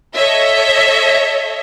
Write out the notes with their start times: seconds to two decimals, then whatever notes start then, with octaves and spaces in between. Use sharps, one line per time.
0.14 A4 C#5 D#5 E5